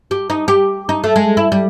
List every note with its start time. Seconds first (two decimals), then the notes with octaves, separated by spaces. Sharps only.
0.11 G4
0.30 D#4
0.48 G4
0.89 D#4
1.04 A3
1.16 G#3
1.37 E4
1.52 G3